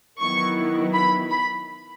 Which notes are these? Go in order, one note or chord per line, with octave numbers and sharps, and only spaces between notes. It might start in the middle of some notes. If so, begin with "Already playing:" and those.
D#3 F#3 B3 E4 C#6
B5
B5